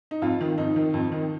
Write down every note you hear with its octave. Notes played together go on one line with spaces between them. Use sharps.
D#4
F2 F4
D#3
F2 D#4
D#3
F2
D#3